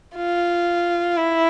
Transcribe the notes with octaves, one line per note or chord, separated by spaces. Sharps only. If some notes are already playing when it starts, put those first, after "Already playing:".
F4
E4